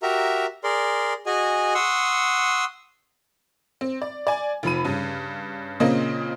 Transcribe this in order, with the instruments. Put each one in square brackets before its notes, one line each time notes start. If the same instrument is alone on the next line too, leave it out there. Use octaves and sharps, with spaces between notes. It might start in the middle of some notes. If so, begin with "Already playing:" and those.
[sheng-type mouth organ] F#4 G4 A#4 E5 A#5
G#4 A#4 D5 C6
F#4 G#4 D#5 G#5
F#5 C6 C#6 D#6 E6
[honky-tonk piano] C4
D5
D5 G#5
F1 F3 B5 D#7
G2 C#3
A#2 C#3 A#3 C4 D#5